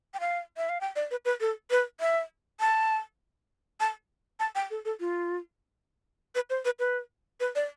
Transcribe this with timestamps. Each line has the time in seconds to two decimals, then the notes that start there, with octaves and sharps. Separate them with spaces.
0.14 G5
0.20 F5
0.57 E5
0.69 F5
0.81 G5
0.96 D5
1.11 B4
1.25 B4
1.41 A4
1.71 B4
2.00 E5
2.60 A5
3.80 A5
4.40 A5
4.55 G5
4.70 A4
4.85 A4
5.00 F4
6.35 B4
6.50 C5
6.65 B4
6.79 B4
7.40 B4
7.55 D5